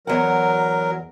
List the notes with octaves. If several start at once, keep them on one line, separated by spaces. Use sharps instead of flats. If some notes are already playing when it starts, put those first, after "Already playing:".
E2 F#3 A#4 F#5